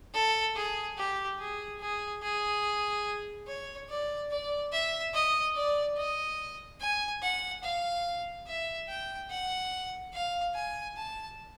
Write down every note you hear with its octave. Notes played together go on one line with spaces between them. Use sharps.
A4
G#4
G4
G#4
G#4
G#4
C#5
D5
D5
E5
D#5
D5
D#5
G#5
F#5
F5
E5
G5
F#5
F5
G#5
A5